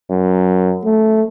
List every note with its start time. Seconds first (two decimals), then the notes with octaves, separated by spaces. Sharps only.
0.10 F#2
0.85 A3